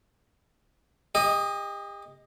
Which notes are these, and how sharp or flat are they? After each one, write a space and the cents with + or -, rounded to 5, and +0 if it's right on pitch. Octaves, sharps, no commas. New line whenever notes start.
G4 +40 D#5 +0